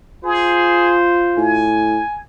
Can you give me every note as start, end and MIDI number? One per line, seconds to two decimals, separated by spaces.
0.25 1.71 65
0.25 0.97 68
0.25 1.46 72
1.37 2.00 45
1.37 2.19 80